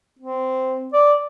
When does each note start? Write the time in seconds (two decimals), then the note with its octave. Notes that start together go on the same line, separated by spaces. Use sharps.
0.19 C4
0.93 D5